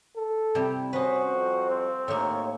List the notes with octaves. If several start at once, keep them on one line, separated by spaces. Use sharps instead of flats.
A4
C3 G3 E4
C#4 F#4 B4 C5 D#5
F2
C4
D#2 A2 A#3 C#5